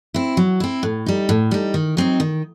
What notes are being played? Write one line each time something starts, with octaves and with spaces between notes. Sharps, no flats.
C4 E4
F#3
C4 E4
A2
G3 D#4
A2
G3 D#4
D#3
F#3 C4 D#4
D#3